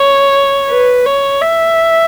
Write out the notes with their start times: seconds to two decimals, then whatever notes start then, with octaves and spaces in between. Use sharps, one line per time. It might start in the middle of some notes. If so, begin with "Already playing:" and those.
Already playing: C#5
0.71 B4
1.06 C#5
1.42 E5